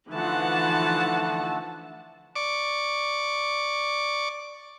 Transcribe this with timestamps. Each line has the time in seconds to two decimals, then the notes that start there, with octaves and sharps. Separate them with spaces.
0.11 D3 E3 F3 A3 D#4 F#5 A5
2.36 D5 C#6 D6